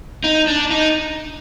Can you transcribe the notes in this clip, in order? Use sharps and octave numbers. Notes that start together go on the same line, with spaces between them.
D#4
D4
D#4